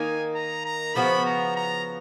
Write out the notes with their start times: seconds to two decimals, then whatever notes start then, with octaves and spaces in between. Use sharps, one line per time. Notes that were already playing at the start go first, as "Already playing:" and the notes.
Already playing: D#3 A#3 D#4 G#5
0.34 A#5
0.65 A#5
0.94 C#3 F3 B3 F#4 B5
1.26 A#5
1.56 A#5